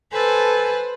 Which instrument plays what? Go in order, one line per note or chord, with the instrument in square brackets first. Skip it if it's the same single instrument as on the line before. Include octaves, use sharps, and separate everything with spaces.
[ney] A4 [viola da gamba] B4 C5 [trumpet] G#5